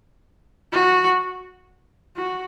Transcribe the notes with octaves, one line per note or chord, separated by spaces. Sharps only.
F#4
F#4